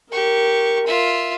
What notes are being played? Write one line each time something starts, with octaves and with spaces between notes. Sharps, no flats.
G4 A#4 C#6
F4 E5